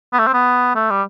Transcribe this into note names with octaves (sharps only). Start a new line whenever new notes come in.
B3
A3
C4
B3
A3
G3